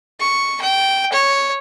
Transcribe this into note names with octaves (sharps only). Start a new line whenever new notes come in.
C#6
G5
C#5